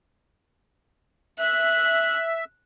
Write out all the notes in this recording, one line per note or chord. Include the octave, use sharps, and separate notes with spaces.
E5 F#6